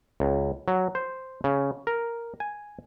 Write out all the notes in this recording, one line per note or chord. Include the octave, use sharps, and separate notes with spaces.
C#2
F#3
C5
C#3
A#4
G#5